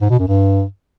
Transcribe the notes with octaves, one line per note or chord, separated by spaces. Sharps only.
G#2
B2
F#2
G2